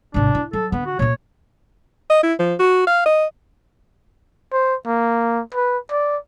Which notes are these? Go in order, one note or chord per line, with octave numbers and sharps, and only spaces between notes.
G#1 C3 D4
E4
F#3 A4
D3 B3
F#4
A#2 A#3 C#5
D#5
E4
F3
F#4
F5
D#5
C5
A#3
B4
D5